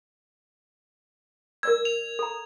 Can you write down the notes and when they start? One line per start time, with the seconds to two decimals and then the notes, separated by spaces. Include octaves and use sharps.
1.63 A#4 D5 E6 G#6
1.85 F7
2.19 A4 A#5